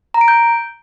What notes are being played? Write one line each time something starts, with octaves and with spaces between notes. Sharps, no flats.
A#5
D7
G6